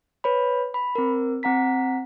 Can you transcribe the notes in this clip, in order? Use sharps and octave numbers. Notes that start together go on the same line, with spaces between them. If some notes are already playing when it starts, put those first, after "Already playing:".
B4 C#5 B5
B5
C4 A#4
C4 F#5 A#5 B6